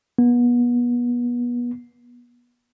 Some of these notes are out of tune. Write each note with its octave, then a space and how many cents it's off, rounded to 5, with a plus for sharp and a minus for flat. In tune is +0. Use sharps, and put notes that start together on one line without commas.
B3 -30